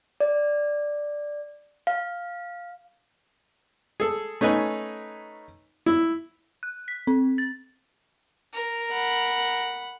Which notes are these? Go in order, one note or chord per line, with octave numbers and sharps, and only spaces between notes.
D5
F5
G#4 A4
A3 C#4 D#4 B4 G#5
E4
F#6
B6
C4
A6
A#4
F#5 B5